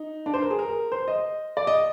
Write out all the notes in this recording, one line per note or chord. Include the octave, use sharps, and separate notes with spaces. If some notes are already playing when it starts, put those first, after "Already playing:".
Already playing: D#4
D4
C5
A#4
G#4
A#4
C5
D#5
D5
D#5